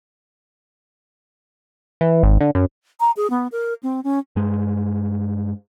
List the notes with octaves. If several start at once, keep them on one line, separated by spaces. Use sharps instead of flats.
E3
G#1
D3
F#2
A#5
G#4
B3
A#4
C4
C#4
G2 G#3